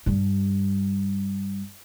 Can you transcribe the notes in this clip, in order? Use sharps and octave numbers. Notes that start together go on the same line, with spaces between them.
G2 G3